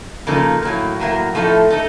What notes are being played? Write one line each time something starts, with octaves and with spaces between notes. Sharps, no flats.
C#3 F3 A#3 D#4 A4
A2 F#3 A#3
A2 F#3 A#3
A2 F3 A3 D#4 A4
A3 D#4 A4